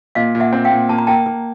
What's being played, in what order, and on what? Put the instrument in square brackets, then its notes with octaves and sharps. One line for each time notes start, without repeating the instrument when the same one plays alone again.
[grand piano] A#2 [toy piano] D#5 F5
[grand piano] A#2
[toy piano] E5 F#5
[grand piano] C4
[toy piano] F5 G5
[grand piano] A#2
[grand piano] A#3 [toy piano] A5
[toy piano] A#5
[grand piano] A#3 [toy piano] G5 A5
[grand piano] A#3